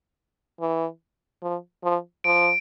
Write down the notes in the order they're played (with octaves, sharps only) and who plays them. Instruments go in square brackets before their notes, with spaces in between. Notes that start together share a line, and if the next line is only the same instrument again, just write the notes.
[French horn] E3
F3
F3
[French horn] F3 [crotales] D7